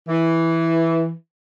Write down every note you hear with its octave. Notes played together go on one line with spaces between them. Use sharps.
E3